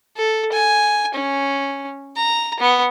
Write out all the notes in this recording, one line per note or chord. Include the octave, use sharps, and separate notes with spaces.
A4
G#5
C#4
A#5
B3